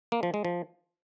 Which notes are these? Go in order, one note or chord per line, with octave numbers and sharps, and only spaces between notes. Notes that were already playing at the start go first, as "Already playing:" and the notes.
A#3
F3
G#3
F3